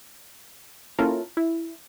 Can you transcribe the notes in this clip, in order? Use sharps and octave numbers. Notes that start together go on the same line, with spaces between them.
A#3 C#4 E4 F4 A4 A#4
E4